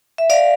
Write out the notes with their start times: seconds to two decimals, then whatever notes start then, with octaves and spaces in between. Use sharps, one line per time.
0.18 E5
0.30 D5 F5